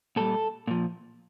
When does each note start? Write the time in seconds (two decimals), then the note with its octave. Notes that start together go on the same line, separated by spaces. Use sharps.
0.16 A#2 G3 A4
0.67 A#2 F3